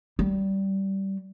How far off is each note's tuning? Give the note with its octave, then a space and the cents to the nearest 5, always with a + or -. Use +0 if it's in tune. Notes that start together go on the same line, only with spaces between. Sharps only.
G3 -15